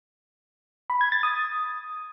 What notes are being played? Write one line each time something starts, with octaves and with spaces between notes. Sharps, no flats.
B5
G#6
A6
D#6